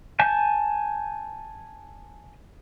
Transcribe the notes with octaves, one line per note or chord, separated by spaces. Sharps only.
G#5 A5 G6